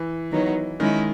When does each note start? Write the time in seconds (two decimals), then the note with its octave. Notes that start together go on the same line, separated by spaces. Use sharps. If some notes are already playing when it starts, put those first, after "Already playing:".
Already playing: E3
0.32 D#3 F#3 B3 D#4
0.80 D#3 G#3 C#4 E4